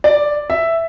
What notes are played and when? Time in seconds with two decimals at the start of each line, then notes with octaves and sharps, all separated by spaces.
0.04 D5
0.50 E5